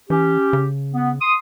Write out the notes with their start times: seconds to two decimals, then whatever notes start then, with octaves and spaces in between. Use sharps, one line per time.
0.10 E3 C#4 G4
0.53 C#3
0.93 B3
1.20 C6 D#6